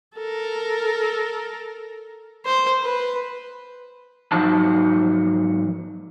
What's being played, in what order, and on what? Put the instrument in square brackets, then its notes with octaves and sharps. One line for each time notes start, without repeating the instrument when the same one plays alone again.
[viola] A4 A#4
[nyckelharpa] C5
B4
[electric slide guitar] G#2 F3 F#3 D#4 A5